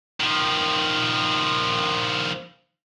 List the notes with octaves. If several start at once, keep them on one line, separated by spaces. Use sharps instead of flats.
D#3 F3